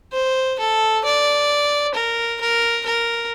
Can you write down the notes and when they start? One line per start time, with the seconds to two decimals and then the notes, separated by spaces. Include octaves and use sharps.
0.14 C5
0.59 A4
1.05 D5
1.95 A#4
2.41 A#4
2.86 A#4